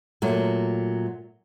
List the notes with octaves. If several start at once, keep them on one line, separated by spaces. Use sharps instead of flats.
A#2 F#3 A3